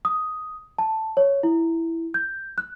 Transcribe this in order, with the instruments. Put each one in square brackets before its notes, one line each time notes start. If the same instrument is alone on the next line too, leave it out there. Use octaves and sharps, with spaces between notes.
[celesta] D#6
A5
C#5
E4
G6
F#6